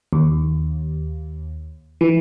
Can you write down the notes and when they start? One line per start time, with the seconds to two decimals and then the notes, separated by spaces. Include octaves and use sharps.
0.13 D#2
2.01 E3